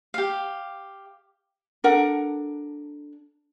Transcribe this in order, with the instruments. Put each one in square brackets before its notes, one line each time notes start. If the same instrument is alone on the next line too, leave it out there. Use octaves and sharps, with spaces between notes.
[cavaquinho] G4 F5
[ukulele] D4 A4 A#4 F#5